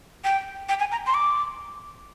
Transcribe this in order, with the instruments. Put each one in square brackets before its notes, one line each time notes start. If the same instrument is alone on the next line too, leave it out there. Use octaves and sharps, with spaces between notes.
[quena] G5
G5
G#5
A#5
C6
D6